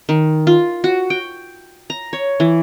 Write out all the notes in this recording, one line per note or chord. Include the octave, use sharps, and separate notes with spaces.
D#3
F4
F#4
G5
A#5
C#5
E3